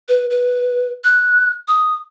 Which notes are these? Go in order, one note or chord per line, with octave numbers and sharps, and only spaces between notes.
B4
B4
F#6
D#6